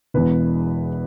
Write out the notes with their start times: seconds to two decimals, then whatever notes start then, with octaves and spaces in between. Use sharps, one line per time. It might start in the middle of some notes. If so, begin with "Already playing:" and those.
0.14 E1 E2 E3 B4